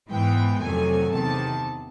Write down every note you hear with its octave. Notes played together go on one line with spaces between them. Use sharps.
G#2 E3 G#3 B3 G5
F2 C3 D#3 F#3 A3 G#5
E2 C3 D#3 A5